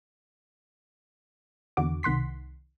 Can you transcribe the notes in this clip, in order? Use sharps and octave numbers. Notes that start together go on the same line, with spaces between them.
E2 D3 F#4 D6
C2 D#3 F#5 C6 B6